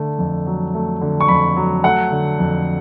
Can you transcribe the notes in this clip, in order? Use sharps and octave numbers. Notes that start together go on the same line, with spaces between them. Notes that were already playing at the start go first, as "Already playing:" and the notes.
Already playing: D3 A3
F2
F#3
A3
D3
C#6
F2 B5
F#3
A3 F#5
D3
F2